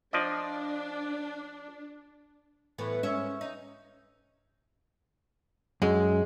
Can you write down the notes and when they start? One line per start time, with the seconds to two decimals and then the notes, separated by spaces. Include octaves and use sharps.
0.13 F3 D4 D5 D#5
2.78 A2 E3 B3
3.03 G#2 C#4 E5
3.41 D#4
5.82 F#2 G#3